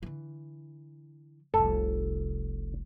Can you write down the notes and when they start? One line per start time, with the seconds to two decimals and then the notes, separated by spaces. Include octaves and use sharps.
0.03 D3 E3
1.54 F1 C2 A4